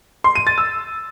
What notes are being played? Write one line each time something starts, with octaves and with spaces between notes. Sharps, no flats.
C6
D#7
A6
E6